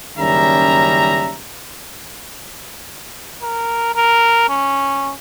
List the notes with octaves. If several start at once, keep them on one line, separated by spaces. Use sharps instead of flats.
F#1 D#3 G3 C#4 E5 A#5
A#4
A#4
C#4